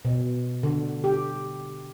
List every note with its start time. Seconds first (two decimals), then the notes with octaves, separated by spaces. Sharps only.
0.05 B2
0.63 D3
1.04 G4